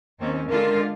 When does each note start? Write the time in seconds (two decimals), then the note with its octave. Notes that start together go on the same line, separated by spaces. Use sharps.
0.19 D#2 C4 C#4
0.48 D3 G#3 F4 A#4